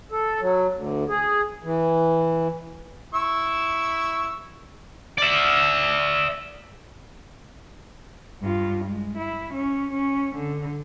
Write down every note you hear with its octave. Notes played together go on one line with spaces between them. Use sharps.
A4
F#3
D2
G#4
E3
E4 C#6 E6
D5 E5
G2 F4
G#3
E4
C#4
C#4
D3